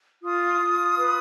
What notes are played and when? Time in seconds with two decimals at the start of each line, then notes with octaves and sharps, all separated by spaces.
0.23 F4 D#6
0.60 F4
0.96 B4